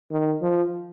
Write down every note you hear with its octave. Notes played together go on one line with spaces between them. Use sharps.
D#3
F3